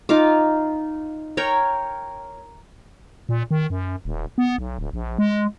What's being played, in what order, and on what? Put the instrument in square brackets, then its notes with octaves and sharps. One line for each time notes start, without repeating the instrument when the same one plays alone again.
[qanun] D#4 F4 F5 D6
A#4 C#5 G5 A#5
[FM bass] A#2
D#3
F#2
D#1
B3
B1
D1
A#1
G#3